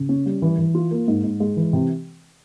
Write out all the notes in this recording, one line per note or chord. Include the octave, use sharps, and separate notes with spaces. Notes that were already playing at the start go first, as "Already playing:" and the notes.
Already playing: C#3
C#4
G3
E3
E3
F4
A#3
G#2
G#2
G#3
E3
C3